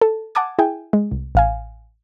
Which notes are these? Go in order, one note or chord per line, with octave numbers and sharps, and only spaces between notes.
A4
F#5 G#5 A5 D6 D#6 G#6
E4 G#4 G5 G#5
G#3
C2
A1 F5 G#5